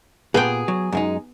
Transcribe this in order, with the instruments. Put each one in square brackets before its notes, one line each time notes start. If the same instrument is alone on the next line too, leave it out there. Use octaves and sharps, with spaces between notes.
[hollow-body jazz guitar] A#2 [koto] B3 G5 [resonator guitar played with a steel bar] G#4
[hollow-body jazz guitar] F#3
F#2 G#3 D#4